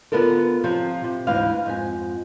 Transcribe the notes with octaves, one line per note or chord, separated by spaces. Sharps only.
D3 B3 F4 A4 A#4
C3 F3 F4
C3
D2 G#2 E3 F5
F2 G#2 G#5